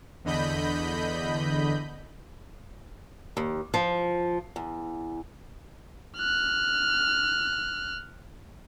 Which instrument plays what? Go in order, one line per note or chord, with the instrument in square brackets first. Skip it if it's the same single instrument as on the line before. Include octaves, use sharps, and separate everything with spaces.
[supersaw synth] E2 D3 D#5 B5 G6
[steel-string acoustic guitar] D#2
F3
E2
[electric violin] F6 F#6